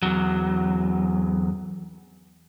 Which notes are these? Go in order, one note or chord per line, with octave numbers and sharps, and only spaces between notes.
E2 F#3